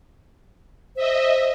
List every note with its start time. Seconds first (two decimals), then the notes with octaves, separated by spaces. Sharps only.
0.96 C5 D#5 E5